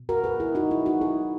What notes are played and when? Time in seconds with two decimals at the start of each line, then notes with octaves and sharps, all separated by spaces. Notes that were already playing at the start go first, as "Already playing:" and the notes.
Already playing: B2
0.09 F#4 A#4
0.24 G#4 B4
0.40 E4 G#4
0.55 D#4 F#4
0.71 E4
0.86 D#4 F#4
1.01 E4 G#4